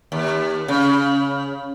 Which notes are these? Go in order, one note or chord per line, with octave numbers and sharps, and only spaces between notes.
D#2
C#3